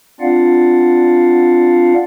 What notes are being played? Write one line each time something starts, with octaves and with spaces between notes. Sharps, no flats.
C4 D4 F4 D5 F5 F#5